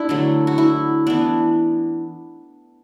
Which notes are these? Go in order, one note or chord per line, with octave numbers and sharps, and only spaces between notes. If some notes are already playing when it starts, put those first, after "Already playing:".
Already playing: D4 E4
D3 F#3 A3
F#4
E4
E3 B3 D4